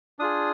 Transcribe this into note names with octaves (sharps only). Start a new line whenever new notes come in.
D4 F4 G#4 D#6